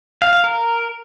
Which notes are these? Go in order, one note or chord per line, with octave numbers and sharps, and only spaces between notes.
F5
F5
A#4